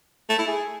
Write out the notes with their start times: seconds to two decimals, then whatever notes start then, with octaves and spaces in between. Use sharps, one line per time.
0.29 A3
0.38 E4
0.48 G#4